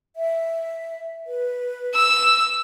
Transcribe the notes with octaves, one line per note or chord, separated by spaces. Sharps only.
E5
B4
E6